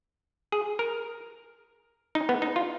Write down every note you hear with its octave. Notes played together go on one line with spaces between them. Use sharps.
G#4
A#4
D#4
B3
D#4
F4